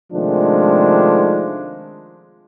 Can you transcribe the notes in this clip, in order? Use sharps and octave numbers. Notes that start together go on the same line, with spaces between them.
C3 D#3 F3 G#3 A3 D4